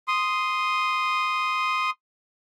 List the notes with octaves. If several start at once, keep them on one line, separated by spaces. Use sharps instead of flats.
C6 D#6